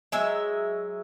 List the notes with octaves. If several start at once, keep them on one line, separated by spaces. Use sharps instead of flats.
F#3 G#3 E5